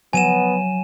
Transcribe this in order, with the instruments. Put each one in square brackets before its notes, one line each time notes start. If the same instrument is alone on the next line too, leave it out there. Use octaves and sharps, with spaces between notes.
[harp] F#3 [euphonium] B3 [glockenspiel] G#5 D#7 E7